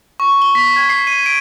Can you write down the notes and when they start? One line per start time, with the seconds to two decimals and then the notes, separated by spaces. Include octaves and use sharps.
0.20 C#6
0.42 G7
0.55 B6
0.76 G#6
0.90 C7
1.07 D#7
1.26 D7